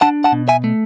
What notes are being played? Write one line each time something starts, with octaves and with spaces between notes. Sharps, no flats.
D4 F#5 A5
F#5 A5
B2
E5 G#5
A3